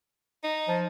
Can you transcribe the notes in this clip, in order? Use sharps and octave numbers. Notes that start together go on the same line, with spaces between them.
D#4
F3